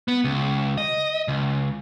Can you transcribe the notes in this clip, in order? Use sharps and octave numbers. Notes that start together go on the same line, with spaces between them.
B3
C#2
D#5
C#2